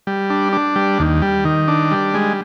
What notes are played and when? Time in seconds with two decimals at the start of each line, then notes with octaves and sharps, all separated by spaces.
0.07 G3
0.30 D4
0.53 D4
0.76 G3
0.99 D#2
1.22 G3
1.45 D#3
1.68 D4
1.91 G3
2.14 G#3